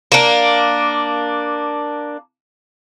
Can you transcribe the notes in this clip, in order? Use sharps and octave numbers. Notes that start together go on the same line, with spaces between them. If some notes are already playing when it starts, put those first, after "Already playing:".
A#3 D4